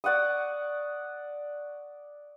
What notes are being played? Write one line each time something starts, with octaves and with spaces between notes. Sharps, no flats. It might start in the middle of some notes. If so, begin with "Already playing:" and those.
D5 F#5 C#6 D#6